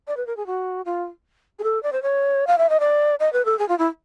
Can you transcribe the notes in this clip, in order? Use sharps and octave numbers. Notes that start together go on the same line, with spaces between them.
D5
B4
A#4
G#4
F#4
F4
G#4
A4
D5
C5
C#5
F5
E5
D#5
D5
D#5
B4
A4
G#4
F4
E4